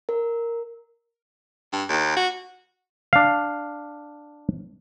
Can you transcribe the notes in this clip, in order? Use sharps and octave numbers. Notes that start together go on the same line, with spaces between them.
A#4
G2
D#2
F#4
D4 F5